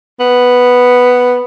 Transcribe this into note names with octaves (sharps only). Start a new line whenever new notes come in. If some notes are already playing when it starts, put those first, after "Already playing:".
B3